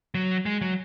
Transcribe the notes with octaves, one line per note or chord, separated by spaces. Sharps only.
F#3
G#3
F#3